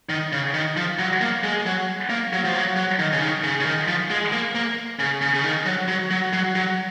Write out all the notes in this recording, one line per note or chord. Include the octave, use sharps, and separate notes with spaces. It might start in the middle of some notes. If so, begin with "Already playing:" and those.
D#3
C#3
D#3
F3
F#3
A#3
G#3
F#3
A#3
F#3
F3
F#3
F#3
D#3
C#3
D#3
C#3
C#3
D#3
F3
G#3
A#3
A#3
C#3
C#3
C#3
D#3
F#3
F#3
F#3
F#3
F#3